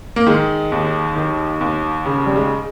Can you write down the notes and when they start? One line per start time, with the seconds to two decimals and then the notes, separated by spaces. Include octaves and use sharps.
0.16 A#3
0.27 D#3 G#3
0.72 D#2
1.16 D#3
1.61 D#2
2.06 C#3
2.26 G3
2.36 G#3